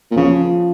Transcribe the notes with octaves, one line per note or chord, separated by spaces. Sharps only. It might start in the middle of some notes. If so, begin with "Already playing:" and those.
A#2
C#3 F3